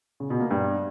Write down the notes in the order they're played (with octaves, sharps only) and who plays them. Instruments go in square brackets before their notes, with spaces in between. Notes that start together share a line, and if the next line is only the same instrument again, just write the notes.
[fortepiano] C#3
B2
A#3
G2